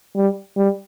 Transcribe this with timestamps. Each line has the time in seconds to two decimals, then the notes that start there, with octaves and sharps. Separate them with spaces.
0.16 G3
0.57 G3